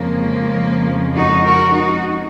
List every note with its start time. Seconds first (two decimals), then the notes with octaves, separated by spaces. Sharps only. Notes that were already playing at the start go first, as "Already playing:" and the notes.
Already playing: F2 C#3 F3 G#3 A#3
1.16 D#4 F#4
1.44 F#4 A#4
1.72 D#4 F#4